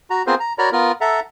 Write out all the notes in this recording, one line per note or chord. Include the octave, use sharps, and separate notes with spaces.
F#4 A#5
B3 C4 F4 G#4 A#4 C5
A#5
F#4 A#4 C#5 D5 A#5 B5
B3 F4 A#4
A4 E5 F#5 A#5